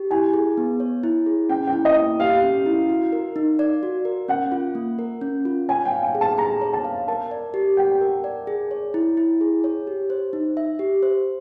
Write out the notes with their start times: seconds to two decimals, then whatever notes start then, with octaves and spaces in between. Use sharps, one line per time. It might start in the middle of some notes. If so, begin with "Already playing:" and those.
Already playing: G4
0.11 E4 G#5
0.33 G#4
0.57 B3
0.80 C#5
1.03 E4
1.26 G#4
1.49 C#4 G5
1.67 G5
1.73 E4
1.85 D#5
1.97 A#3
2.20 G4 F5
2.43 C#4
2.66 E4
2.89 F#4
3.12 A#4
3.36 D#4
3.59 D5
3.83 F#4
4.05 A#4
4.28 C#4 F#5
4.52 F4
4.75 A#3
4.99 A#4
5.21 C#4
5.45 F4
5.69 C#5 G#5
5.85 G5
5.91 F5
6.03 G#5
6.15 G#4
6.21 A5
6.38 G#4 A#5
6.61 C#5
6.73 A5
6.84 F5
7.08 A#4 A5
7.31 D5
7.54 G4
7.77 F#5 G5
8.01 A#4
8.24 D5
8.47 G#4
8.71 C#5
8.94 E4
9.17 E4
9.41 G#4
9.64 C#5
9.87 G4
10.10 C5
10.33 D#4
10.57 E5
10.79 G4
11.03 C5